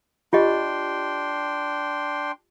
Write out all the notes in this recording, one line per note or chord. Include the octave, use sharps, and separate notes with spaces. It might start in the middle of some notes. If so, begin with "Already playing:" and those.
D4 F4 G4 D#5 G5 C6